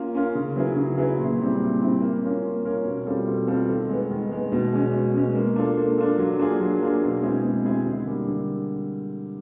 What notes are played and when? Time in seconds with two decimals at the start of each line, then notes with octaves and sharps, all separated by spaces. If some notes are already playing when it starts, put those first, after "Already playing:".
Already playing: A#3 C#4 F4 A#4
0.15 C#4 F4 A#4
0.35 C#3
0.56 F#3 B3 E4 G#4
0.76 C#3
0.98 F#3 B3 E4 G#4
1.19 A#2
1.39 G3 C4 E4
1.61 A#2
1.81 G3 C4 E4
2.02 A#3
2.23 C#4 F4 A#4 C#5
2.44 A#3
2.65 C#4 F4 A#4 C#5
2.85 B2
3.06 G3 C4 F4 A4
3.27 B2
3.47 G3 C4 F4 A4
3.69 D#3
3.89 G#3 B3
4.11 D#3
4.32 G#3 B3
4.52 B2
4.72 G#3 C#4
4.94 B2
5.15 G#3 C#4
5.35 A#3
5.56 D4 F4 A4
5.77 A#3
5.98 D4 F4 A4
6.18 F#3
6.39 A#3 D4 F4 G#4
6.60 F#3
6.81 A#3 D4 F4 G#4
7.02 B2
7.22 G#3 C4 E4 G#4
7.43 B2
7.65 G#3 C4 E4 G#4
7.85 D3
8.06 G3 A#3
8.27 D3